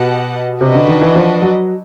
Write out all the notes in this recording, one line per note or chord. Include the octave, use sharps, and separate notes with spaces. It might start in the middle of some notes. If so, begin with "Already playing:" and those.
Already playing: B2 G4 B4 D#5 F#5 A5
C3 D4 F#4 B4 D#5
D3
D#3
E3
F3
F#3